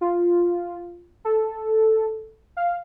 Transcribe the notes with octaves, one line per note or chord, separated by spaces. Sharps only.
F4
A4
F5